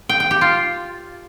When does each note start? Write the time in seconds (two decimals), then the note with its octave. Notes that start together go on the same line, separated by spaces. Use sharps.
0.09 G5
0.20 G5
0.31 G4
0.41 F4